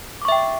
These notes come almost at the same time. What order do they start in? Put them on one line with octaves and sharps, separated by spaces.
D6 C#6 E5 G5